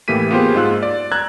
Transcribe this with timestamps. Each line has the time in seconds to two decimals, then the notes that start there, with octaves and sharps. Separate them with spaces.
0.08 A2 E3 A#3 G4 B6 D#7
0.31 A#3 B3 F4 G4 G#4 C5
0.55 G#2 G#3 F4 E6 F#6
0.83 D5
1.12 A#5 E6 F#6 G#6